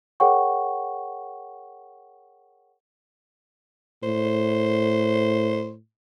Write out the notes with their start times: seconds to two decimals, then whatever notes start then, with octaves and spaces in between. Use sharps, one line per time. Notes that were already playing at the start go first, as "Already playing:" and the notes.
0.20 G#4 A#4 C#5 F#5 G5 C#6
4.03 A2 C5